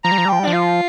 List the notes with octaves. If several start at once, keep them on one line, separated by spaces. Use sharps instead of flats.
F3 A#5
G3
F3
G3
F3 G5
G3
F3 D4
F4